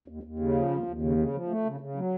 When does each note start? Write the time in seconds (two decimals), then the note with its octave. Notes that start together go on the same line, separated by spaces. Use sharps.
0.08 D#2
0.23 D#2
0.39 C#3
0.55 F3
0.70 D#2
0.86 D#2
1.01 C#3
1.17 C#3
1.33 F3
1.49 A3
1.65 C#3
1.80 C#3
1.96 F#3